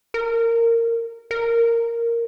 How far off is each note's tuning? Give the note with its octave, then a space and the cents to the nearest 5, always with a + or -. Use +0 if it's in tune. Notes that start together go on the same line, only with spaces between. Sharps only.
A#4 -15
A#4 -5